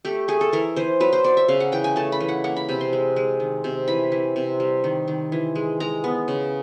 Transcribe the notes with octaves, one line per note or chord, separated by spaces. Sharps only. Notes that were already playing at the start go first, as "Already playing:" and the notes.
A3 G4
A3 G#4
A4
E3 A#4
E3 C5
F#3 B4
C5
F#3 D5
E5
C#3 F5
F#5
E3 G5
G#5
A3 A5
B5
E3
F#5
A#3 F#5
B5
C3 B5
C6
G#3
G#3
D#3
C3
E3 B5
E3
C3
G3
D#3
D#3
E3
G#3
G#3 A#5
B3
C#3